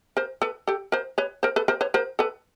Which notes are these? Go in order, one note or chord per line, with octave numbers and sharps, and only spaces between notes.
A#4 C5
A4 B4
G4 A4
A#4 C5
B4 C#5
A#4 C5
A4 B4
A#4 C5
B4 C#5
A#4 C5
A4 B4